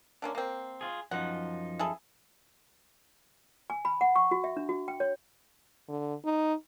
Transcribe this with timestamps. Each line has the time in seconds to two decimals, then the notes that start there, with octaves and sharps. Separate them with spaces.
0.22 D3 A#3 C#4
0.35 A#3 C4
0.81 F4 G#4
1.11 F#2 F3 D#4 F#5
1.79 E4 G#4 A4
3.70 G#5
3.85 B5
4.01 F#5
4.16 C#6
4.31 F#4
4.44 E5
4.57 D4
4.69 F#4
4.88 G5
5.00 C#5
5.89 D3
6.25 D#4